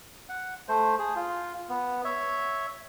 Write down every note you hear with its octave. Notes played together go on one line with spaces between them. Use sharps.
F#5
A3 C5
G#4
F4
B3
C#5 E5